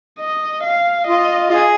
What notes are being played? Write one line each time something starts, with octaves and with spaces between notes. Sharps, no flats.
D#5
F5
F4 D#5
F4 G#4